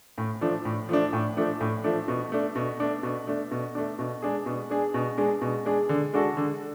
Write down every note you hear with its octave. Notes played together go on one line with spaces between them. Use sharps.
A2
F3 A3 D4
A2
F3 A3 D4
A2
F3 A3 D4
A2
F3 A3 D4
B2
A3 D4
B2
A3 D4
B2
A3 D4
B2
A3 D4
B2
G#3 D4 G#4
B2
G#3 D4 G#4
B2
G#3 D4 G#4
B2
G#3 D4 G#4
D3
G#3 D4 F#4 A4
D3